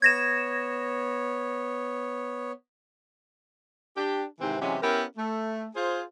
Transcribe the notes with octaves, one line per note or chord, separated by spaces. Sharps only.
B3 C#5 G#6 A#6 E7
D4 G4
G#2 C3 D#3 E3 C4
C3 E3 F#3 G#3 C#4 G4
B3 C#4 E4 G4 A#4
A3
F4 G#4 C5